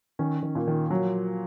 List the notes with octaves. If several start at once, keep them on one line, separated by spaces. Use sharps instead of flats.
D#3 C#4
D#3
A#2
D#3
F3 F#3